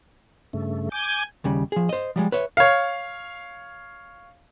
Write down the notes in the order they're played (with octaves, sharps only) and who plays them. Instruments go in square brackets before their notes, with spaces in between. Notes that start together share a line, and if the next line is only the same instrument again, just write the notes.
[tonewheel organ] G2 C#3 A3
[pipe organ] G#5 G6 [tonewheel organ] D6
[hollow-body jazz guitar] D#2 C#3 G3
F3 G#4
C5 D#5
F3 G3 G#3
B4 C#5 E5
[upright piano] C#5 F5